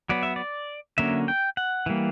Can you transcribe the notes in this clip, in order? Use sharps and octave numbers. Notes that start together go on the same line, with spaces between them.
F#3 B3 D5
E5
D5
D3 F#3 A#3 C#4 E5
G5
F#5
E3 G3 A#3